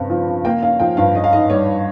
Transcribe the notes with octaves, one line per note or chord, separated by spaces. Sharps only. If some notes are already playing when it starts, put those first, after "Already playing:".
Already playing: G2 C#3 C4
F3
C#3
A#3 G5
C#4 F5
F3 G5
G2 F5
C#4 D#5
F5
G#2 D#5
G3 C#5